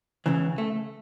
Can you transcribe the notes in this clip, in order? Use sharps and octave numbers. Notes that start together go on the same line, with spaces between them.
C#2 C#3 E3
A3